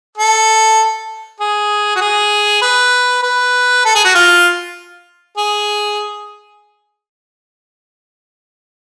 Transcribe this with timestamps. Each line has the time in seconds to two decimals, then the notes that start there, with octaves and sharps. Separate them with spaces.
0.18 A4
1.40 G#4
1.96 F#4
2.01 G#4
2.62 B4
3.23 B4
3.85 A4
3.95 G#4
4.05 F#4
4.15 F4
5.37 G#4